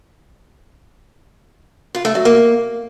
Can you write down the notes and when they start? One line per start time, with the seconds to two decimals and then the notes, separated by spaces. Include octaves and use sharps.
1.95 F4
2.05 A3
2.15 F#3
2.25 A#3